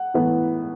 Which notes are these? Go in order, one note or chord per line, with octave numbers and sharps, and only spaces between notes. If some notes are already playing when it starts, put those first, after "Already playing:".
Already playing: F#5
A2 E3 B3